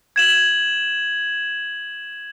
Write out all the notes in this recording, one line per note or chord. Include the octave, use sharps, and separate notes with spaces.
G#6 E7 F#7